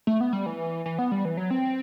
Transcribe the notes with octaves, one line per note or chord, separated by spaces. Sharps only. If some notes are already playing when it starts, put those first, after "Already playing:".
A3
B3
G3
E3
E3
B3
G3
E3
F#3
C4